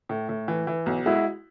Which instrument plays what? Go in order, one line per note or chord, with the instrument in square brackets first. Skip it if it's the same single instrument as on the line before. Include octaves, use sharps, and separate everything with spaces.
[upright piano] A2
A2
E3
E3
B1
[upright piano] G#3 [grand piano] E4 F#4